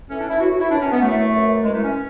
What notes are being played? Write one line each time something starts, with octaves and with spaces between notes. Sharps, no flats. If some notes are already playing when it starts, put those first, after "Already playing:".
A2 E3 C#4
D4
E4
A2 E3 F#4
F#4
E4
F#2 E3 D4
C#4
B3
F#2 E3 A3
F#2 E3
F#2 E3 G#3
A3
C#4